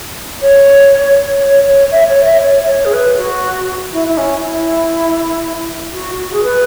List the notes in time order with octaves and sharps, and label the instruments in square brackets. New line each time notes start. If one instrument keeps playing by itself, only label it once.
[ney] C#5
C#5
C#5
E5
C#5
E5
C#5
C#5
G#4
B4
F#4
E4
E4
C#4
E4
F#4
F#4
G#4
B4